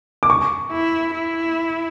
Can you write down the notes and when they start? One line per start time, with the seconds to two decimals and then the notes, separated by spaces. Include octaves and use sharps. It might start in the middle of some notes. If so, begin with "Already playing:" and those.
0.23 D6
0.30 C#6
0.72 E4
1.15 E4